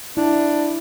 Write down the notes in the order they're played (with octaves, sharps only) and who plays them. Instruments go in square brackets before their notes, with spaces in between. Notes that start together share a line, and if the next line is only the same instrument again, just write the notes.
[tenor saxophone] D4 [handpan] E4